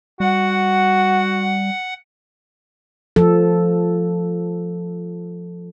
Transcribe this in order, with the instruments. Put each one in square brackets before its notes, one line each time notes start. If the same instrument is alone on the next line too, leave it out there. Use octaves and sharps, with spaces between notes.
[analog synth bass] G3 [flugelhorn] F#4 [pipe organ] F#5
[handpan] F3 A4